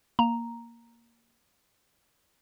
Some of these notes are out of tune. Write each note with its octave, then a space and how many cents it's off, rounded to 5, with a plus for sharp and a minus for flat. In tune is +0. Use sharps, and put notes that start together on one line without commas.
A#3 +0 A#5 +0